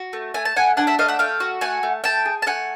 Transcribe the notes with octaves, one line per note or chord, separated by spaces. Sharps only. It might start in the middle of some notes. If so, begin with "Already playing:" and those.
Already playing: F#4
A3
A3 G#5
A5
A3 F#5 G#5
D4 F#5 G#5
E5 F#5
A3 D#5 F5
E5 F#5
A3 F5 G5
F#4
A3 F#5 G#5
A3
A3 G5 A5
G#4
A5
A3 F#5 G#5